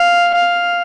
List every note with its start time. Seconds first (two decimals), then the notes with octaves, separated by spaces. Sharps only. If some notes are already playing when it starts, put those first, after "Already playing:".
Already playing: F5
0.35 F5